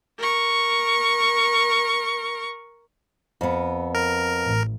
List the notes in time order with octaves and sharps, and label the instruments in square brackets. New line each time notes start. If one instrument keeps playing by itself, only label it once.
[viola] A#4 C#6
[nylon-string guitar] F2 B3
[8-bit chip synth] A#4
[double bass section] A1